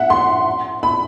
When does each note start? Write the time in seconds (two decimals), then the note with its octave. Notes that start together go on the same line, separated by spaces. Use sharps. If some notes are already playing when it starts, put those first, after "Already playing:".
Already playing: E5 F#5
0.10 C6
0.83 B5